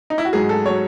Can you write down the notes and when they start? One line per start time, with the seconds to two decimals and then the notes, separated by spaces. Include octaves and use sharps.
0.10 D#4
0.18 E4
0.25 F#4
0.33 G#2 F#3 G#4
0.49 A4
0.66 F#3 C#5